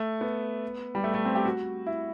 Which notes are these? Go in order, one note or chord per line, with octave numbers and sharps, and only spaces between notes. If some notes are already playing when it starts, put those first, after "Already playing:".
Already playing: A3
B3
G3
A3
A3
C4
G4
F#4
E4